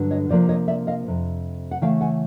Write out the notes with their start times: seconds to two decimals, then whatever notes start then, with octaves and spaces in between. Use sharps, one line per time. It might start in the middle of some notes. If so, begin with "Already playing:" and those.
Already playing: G2 D3 F#3
0.11 C#5 D#5
0.29 C3 F3 A#3 D4 C5 D5
0.49 C#5 D#5
0.68 D5 E5
0.87 D#5 F5
1.08 F2 C3
1.71 F#5
1.82 C#3 E3 A3 F5 G5
2.01 F#5 G#5